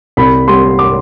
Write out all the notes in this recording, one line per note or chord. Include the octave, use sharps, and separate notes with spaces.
C2 B5
C3 G3 C6
D6